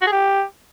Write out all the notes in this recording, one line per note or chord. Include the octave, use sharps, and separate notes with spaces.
F#4
G#4
G4